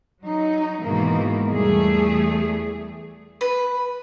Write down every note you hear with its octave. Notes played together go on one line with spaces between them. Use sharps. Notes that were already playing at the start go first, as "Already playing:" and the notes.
F#3 D#4
G#2 B2 D#3 E3 G#3 A#3
E2 E3 G3 A3 G#4
B4